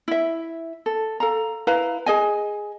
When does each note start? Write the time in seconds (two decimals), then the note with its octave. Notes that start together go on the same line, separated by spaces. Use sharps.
0.08 E4 E5
0.86 A4
1.20 A4 F5 A#5
1.67 E4 B4 F5 A#5
2.06 G#4 D#5 G#5